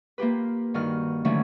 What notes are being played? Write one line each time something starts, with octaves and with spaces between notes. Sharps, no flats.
A#3 F4 G4 B4
G2 D#3 F#4 F6
D3 D#3 F3 F#3 A3 C#4